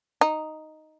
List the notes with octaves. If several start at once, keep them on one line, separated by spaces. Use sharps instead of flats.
D#4